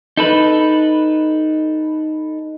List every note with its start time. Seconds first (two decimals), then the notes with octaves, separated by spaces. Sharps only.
0.17 D#4 A4 B4